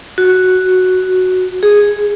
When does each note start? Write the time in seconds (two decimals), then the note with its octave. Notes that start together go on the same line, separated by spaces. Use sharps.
0.18 F#4
1.63 G#4